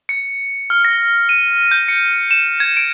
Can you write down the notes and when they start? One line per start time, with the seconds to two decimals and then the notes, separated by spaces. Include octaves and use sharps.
0.09 C#7
0.70 F6
0.85 A#6
1.29 D#7
1.71 G6
1.88 C#7
2.31 E7
2.60 G#6
2.77 D7